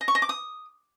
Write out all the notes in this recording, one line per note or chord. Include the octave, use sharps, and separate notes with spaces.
D#5
C#6
D#5
D6
D#6